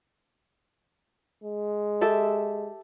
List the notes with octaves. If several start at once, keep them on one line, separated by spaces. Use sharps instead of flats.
G#3
G4 A4 E5